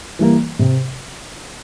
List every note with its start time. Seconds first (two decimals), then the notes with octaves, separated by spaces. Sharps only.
0.19 E3 G3 A#3
0.59 C3